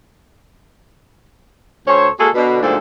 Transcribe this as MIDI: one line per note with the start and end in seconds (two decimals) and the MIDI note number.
1.87 2.08 38
1.87 2.08 69
1.87 2.08 72
1.87 2.08 73
2.18 2.29 56
2.18 2.29 58
2.18 2.29 66
2.18 2.29 68
2.18 2.29 69
2.35 2.58 47
2.35 2.58 50
2.62 2.77 38
2.62 2.77 44
2.62 2.77 53
2.62 2.77 58
2.62 2.77 69
2.62 2.77 74